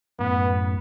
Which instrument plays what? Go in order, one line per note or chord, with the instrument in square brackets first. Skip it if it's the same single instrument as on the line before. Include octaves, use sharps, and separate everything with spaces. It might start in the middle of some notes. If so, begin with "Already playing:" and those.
[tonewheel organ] F#2 A2 [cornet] B3